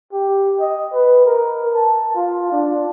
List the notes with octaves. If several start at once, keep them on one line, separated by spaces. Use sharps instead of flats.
G4
D#5
B4
A#4
A5
F4
D4